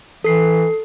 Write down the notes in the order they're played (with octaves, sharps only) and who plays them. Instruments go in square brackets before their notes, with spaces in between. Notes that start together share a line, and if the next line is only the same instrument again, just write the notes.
[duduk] E3 [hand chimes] A4 C7